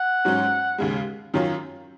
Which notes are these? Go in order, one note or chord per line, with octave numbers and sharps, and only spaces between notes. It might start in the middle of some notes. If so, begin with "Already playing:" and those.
Already playing: F#5
G#2 F#3 C#4
D#2 C#3 G#3
F#2 D#3 F#3 C#4 F4